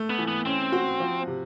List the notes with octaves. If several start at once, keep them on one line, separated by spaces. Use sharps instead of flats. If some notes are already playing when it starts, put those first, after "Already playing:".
Already playing: A3
B3
E3
B3
C4 C#4
F#4
F3
C3